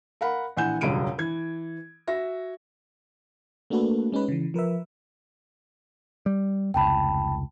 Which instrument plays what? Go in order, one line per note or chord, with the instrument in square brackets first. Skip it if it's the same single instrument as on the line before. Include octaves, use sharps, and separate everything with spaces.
[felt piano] A#4 F5 F#5 B5
A#1 E3 F#5 G#5 G6 E7
E1 C#2 F#2 G3 D7 D#7
E3 G#6
F#4 E5 A#6
[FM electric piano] A3 A#3 D4 F#4 A4 B4
G#3 C#4 D#4 B4
C#3 E3
F3 A#4 B4 E5
[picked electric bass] G3
[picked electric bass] F1 C#2 [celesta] G5 A5 B5